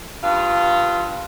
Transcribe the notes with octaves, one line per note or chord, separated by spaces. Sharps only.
G2 F4